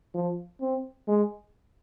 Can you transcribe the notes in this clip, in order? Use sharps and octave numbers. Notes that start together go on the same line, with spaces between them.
F3
C4
G#3